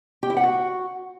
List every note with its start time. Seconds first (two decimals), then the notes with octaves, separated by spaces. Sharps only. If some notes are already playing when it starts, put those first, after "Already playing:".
0.23 G4
0.30 E4
0.37 F#5
0.44 F#4